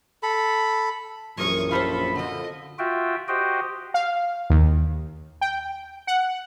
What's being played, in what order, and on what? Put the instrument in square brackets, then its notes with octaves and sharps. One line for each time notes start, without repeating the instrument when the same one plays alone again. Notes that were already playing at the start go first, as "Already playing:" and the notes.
[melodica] A4 B5
[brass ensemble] A#1 F#2 [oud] E3 A#4 C#5 [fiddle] C#6 D#6
[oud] F4 G4 C5 [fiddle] A4 [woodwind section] B5
[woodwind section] F2 D3 [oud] F3 F#4 [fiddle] D#5
[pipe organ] F4 F#4 E5 G5
F#4 G4 C5 D#5 G5
[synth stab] F5
D#2
G5
F#5